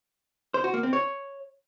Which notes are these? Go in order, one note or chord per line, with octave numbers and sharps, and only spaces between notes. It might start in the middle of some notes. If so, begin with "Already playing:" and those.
C5
F#4
A#3
C4
C#5